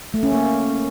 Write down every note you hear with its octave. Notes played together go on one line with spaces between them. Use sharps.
A3
C#4
A#3